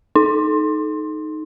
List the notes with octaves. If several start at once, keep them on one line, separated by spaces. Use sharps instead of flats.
D#4